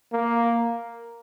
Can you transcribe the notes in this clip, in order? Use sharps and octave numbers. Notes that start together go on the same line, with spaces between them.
A#3